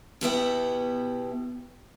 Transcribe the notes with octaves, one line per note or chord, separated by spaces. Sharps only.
B2 B3 E4 G4